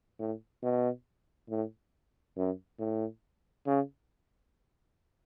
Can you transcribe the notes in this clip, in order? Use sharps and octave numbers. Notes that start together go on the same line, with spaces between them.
A2
B2
A2
F#2
A2
C#3